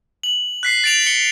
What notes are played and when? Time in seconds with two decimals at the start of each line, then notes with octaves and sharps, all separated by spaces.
0.23 F#7
0.63 F#6 B6 C7
0.84 A6 D7 F7
1.06 C#7 G7